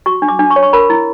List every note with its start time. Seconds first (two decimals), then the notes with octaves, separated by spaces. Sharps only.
0.06 F#4 C#6
0.22 D4
0.28 D6
0.39 D4
0.50 C#6
0.56 C#5
0.63 C#6
0.73 A#4 B5
0.90 E4